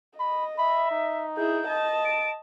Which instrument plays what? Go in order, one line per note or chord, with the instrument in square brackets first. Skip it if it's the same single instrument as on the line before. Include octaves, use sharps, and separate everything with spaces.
[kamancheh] D#5 [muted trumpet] B5
[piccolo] E5 [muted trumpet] B5
[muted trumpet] D#4
[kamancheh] E4 G#4 [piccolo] G6
[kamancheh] D#5 A5
[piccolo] D7